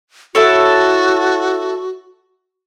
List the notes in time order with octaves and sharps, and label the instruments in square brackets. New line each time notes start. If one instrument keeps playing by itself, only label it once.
[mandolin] E4 A4 C#5 [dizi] F#4